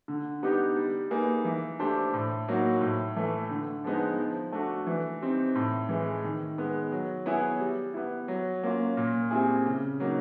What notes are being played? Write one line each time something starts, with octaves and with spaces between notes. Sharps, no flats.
D3
G3 B3 D#4 G4
G3
A#3 D#4 G#4 B4
E3
A3 D4 G4 C5
A2
F#3 A#3 D#4 F#4
A2
E3 A3
D3
F3 G#3 B3 D#4
F3
A3 D4 F#4
E3
G3 C4 D#4
A2
E3 G#3
D#3
G#3 B3
F#3
B3 E4 G#4 C#5
G3
B3 E4
F#3
A#3 C#4 F4
A#2
G3 C4 E4 G#4
C#3
F#3 A#3 D#4